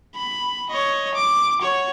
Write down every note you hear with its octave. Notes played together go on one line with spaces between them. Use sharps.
B5
C#5 D#5
D6
F#4 C#5